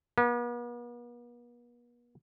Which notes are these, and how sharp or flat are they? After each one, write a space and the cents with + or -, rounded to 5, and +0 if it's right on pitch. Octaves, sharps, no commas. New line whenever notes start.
B3 -45